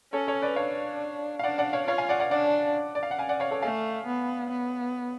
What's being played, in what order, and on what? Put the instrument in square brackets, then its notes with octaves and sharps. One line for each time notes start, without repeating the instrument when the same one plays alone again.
[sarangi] C#4 [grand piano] A4 C#5
[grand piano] A4 C#5
B4 D5
[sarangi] D4 [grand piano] C#5 F5
[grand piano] F5
[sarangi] D4 [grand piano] D5 F#5
[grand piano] D5 F#5
C#5 F5
[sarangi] F4 [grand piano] C#5 F5
[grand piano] F5 G#5
D5 F#5
D5 F#5
[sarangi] D4 [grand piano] D5 F#5
[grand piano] D5
F5
F#5
F5 G#5
D5 F#5
C#5 F5
A4 C#5
[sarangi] A3 [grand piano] F5 G#5
[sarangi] B3
B3